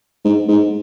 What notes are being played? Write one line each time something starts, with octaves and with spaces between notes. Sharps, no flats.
G#2
G#2